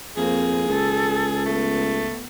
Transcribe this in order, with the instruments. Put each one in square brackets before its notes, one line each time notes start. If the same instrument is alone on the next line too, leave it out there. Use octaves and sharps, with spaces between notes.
[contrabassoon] F2 [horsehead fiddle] A#3 C4 [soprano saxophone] G#4
[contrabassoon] C#2 [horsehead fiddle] A4
[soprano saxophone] A3 [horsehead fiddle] B3